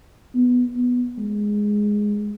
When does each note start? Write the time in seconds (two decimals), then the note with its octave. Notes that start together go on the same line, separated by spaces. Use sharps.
0.35 B3
0.76 B3
1.18 G#3